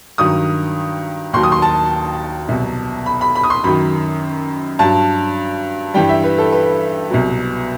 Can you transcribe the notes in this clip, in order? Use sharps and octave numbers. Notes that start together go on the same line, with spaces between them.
G2 D#3 F#3 D#6
D#2 D#3 F#3 C6
D#6
C6
A5
C2 B2 F#3
B5
B5
B5
D#6
C6
F#2 D#3 F#3 B5
G2 F#3 A5
G2 E3 G3 G5
E5
B4
A4
B4
C2 B2 F#3